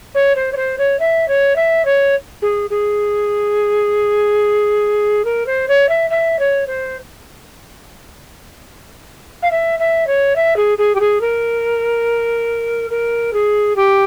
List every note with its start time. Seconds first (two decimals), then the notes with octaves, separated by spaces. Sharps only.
0.15 C#5
0.36 C5
0.53 C#5
0.57 C5
0.78 C#5
0.99 E5
1.28 C#5
1.56 E5
1.85 C#5
2.42 G#4
2.70 G#4
5.25 A#4
5.46 C5
5.68 C#5
5.89 E5
6.10 E5
6.39 C#5
6.67 C5
9.42 F5
9.51 E5
9.79 E5
10.07 C#5
10.36 E5
10.56 G#4
10.78 G#4
10.95 G4
11.00 G#4
11.21 A#4
12.90 A#4
13.33 G#4
13.76 G4